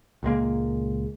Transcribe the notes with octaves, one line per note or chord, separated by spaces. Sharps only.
C#2 A#2 G#3 A#3